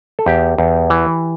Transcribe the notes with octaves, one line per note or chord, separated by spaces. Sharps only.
A4
E2 G4
E2
E3